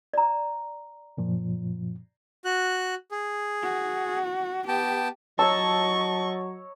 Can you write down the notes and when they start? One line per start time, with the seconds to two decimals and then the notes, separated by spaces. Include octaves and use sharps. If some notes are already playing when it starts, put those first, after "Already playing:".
0.14 D5 A#5
1.17 F#2 A#2 F3
2.45 F#4 F#6
3.11 G#4
3.63 F#4
4.68 B3 G4 G5 A5
5.39 F#3 C#5 D#5 A5 A#5 C#6 E6